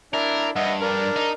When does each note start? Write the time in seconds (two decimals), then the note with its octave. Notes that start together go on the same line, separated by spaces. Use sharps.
0.14 D4 E4 A#4
0.56 G2 D#5 E5 F#5
0.82 D4 A#4
1.16 D#4